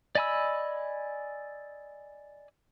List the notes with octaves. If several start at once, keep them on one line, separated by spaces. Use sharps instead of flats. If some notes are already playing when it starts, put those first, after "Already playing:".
D5 D#5 G#5 B5 E6